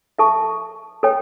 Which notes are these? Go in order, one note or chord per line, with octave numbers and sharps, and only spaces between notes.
A4 E5 A5 C#6
A4 C#5 G5